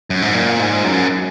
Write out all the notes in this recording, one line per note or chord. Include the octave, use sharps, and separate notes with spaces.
F#2
G#2
A#2
G#2
F#2